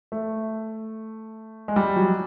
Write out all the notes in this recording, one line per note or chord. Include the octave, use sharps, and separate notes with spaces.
A3
G#3
G3
F#3